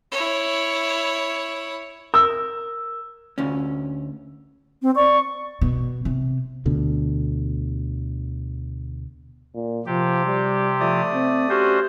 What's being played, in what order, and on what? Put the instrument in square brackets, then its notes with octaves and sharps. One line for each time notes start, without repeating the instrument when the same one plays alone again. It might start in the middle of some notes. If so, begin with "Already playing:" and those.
[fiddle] E4 C#5
[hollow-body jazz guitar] A#4 [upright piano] E6
[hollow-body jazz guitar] D2 C#4
[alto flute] C4
[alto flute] D5 [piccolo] C#6
[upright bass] B2
C3
[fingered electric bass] D2 B2 D3
[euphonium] A#2
[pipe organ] C3 G4 [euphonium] F3
[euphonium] G3
[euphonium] F3 [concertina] A3 D5 D#6
[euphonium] C4
[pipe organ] C#4 F#4 C5 [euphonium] G4